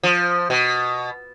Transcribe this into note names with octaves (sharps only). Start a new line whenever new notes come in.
F3
B2